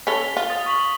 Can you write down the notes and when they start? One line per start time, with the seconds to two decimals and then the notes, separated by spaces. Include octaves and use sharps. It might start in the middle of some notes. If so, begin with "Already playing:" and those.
0.07 C#4 A4 B6 F7 G7
0.37 F4
0.50 D#6 A6
0.66 C#6 B6 F#7